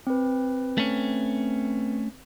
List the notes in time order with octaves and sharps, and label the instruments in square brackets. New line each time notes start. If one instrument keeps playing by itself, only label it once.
[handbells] C4 B4
[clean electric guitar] A3 C#4